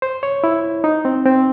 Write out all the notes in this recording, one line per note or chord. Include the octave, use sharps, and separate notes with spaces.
C5
C#5
E4
D#4
C4
C4